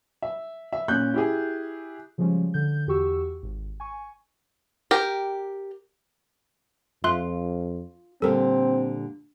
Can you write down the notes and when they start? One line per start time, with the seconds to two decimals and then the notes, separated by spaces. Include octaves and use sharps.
0.22 E5
0.73 E5
0.88 A#2 C#4 F#6 G6
1.14 E4 G4 G#4
2.18 C#3 F3 G3 G#3 C#4
2.54 D3 G6
2.87 E2 F#4 G4 C#6 E6
3.43 G#1
3.80 G#5 C#6
4.91 G4 A#4
7.04 F2 F4 E5 C6 F#6
8.22 A#2 D3 G3 C4 A4 A#4